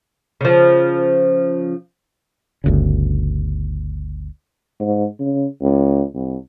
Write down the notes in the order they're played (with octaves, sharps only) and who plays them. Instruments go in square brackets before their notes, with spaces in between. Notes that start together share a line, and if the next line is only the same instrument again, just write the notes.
[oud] C#3 F3
[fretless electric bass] G1 D2 C#3
[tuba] G#2
C#3
C#2
C2